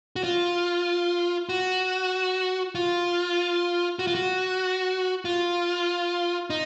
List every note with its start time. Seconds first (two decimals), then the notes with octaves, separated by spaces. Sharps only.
0.16 F#4
0.24 F4
1.49 F#4
2.75 F4
3.99 F#4
4.07 F4
4.15 F#4
5.25 F4
6.50 D#4